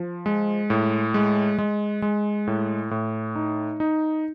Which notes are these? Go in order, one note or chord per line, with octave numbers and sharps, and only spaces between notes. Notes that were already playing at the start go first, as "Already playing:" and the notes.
Already playing: F3
G#3
A2
G#3
G#3
G#3
A2
A2
D#4
D#4